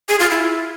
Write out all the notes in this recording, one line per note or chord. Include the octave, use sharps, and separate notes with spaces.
G#4
F4
E4